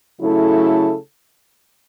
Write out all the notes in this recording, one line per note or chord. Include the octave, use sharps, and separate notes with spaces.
C#3 F#3 A3 E4 A4